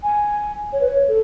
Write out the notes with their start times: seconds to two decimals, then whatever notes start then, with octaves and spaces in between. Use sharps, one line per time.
0.03 G#5
0.73 C#5
0.81 B4
0.88 C#5
1.08 A4